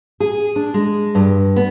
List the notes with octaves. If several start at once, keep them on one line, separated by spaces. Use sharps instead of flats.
G#4
D4
G#3
G2
B3